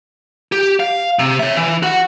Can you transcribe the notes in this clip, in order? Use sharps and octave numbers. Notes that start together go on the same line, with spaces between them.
G4
F5
C3
C#5 E5
E3
F#4 F#5